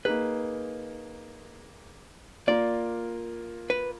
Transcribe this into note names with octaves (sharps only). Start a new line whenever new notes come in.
A#3 D#4 G#4 B4
A#3 F4 A#4 D5
B4